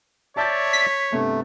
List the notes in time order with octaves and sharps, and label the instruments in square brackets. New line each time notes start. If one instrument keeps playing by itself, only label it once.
[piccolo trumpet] C#5 [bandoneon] D5 E5 [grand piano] A5 G6 A6
[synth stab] B6
[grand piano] G2 C3 B3 [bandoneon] A3